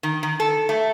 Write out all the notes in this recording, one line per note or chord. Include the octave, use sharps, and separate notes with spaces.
D#3
D#3
A4
A3